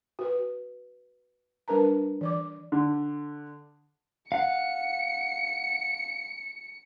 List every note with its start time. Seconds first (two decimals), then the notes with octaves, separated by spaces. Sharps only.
0.19 F#4 B4
1.68 G3 D4 A#4 B4 A5 A#5
2.21 E3 D5 D6
2.72 D3
4.32 F5 F#5 C#7